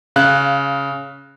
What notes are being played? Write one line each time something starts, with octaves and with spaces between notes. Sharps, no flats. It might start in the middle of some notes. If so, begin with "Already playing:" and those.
C#3 F5 F#6